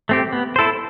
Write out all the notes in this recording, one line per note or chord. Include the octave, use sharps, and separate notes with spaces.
A3 C4 G4
B3
E4 A4 C5